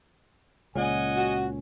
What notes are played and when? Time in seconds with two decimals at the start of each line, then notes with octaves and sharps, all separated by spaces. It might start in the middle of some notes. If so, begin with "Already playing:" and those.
0.75 C#2 A#2 C#3 C#4 D#5 F#5 G#5
1.17 F#4